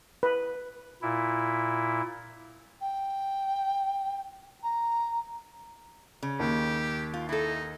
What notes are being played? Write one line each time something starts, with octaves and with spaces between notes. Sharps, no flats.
B4
A#2 E4
G5
A#5
C#3
D#2 G4
F4
D#4 E4 A4